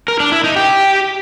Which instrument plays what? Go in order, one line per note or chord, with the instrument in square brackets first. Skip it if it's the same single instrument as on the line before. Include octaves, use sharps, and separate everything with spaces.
[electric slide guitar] A#4
D4
E4
D#4
G4